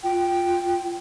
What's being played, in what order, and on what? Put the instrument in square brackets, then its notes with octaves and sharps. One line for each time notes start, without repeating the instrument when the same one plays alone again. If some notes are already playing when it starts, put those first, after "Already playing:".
[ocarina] F4 [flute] G5